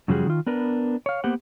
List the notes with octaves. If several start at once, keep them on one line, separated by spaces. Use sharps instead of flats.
F#2 C#3 F3 G3 F#4 G#4
D#3 F4
B3 D4 A#4 B4
C#5 F5
A#3 B3 G4 C5 F#5